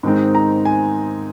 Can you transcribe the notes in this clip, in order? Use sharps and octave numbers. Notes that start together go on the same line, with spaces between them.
G#2 D#3 G#3 C4 D#4
A#5
G#5